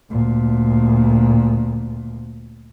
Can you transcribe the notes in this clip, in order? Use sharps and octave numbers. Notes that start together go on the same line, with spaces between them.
D2 A#2